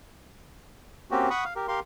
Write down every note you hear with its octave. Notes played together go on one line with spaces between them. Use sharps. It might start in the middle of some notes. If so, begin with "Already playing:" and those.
A#3 C4 C#4 F#4 G4
F#5 B5 C#6 D#6
F5
G4 A#4
G4 A#4 F5 C6